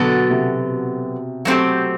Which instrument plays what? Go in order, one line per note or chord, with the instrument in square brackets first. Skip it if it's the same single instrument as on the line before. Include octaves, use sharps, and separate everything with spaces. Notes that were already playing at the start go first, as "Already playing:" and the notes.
Already playing: [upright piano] B2 [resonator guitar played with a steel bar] D3 F#3 B3 F#4 A4
[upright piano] C3
[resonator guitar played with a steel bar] F#3 A3 C4 G4